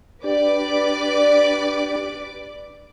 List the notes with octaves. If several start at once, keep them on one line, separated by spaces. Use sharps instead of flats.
D4 G4 B4 D5 D6